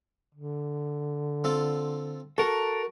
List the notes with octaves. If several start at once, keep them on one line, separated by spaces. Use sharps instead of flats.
D3
C4 F4 A4
F#4 A4 A#4 F#5